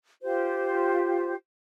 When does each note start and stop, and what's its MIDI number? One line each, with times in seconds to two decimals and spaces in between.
0.22 1.33 65
0.22 1.33 67
0.22 1.33 72